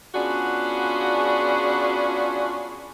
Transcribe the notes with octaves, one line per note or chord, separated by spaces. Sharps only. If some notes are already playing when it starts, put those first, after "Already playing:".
B3 C#4 D4 F4 F#4 G#4